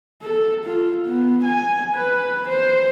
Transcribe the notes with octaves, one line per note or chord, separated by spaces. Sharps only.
A4
F4
B3
G#5
B4
C5